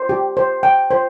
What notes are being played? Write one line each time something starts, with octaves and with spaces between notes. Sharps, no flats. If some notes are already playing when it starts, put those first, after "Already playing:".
Already playing: C5
G4
C5
G5
C5